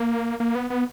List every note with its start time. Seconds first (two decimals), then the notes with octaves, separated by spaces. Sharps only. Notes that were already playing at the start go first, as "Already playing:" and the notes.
Already playing: A#3
0.40 A#3
0.55 B3
0.70 B3